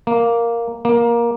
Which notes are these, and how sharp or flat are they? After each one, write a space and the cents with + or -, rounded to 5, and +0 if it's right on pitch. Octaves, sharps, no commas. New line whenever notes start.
A#3 +0
A#3 +15